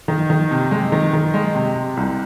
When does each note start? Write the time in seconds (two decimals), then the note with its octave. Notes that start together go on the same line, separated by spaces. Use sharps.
0.08 D#3
0.30 D#3
0.51 C3
0.71 G#3
0.92 D#3
1.13 D#3
1.34 G#3
1.55 C3
1.76 C3
1.97 C2